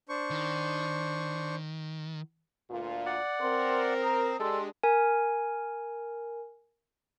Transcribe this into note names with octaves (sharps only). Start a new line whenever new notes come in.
D4 C5 C#6
D#3
D2 A#2 F4
D5 F#5
C4 A#4 C6
A#5 D#6
G#3 D4 G4 A4 C6
A#4 G#5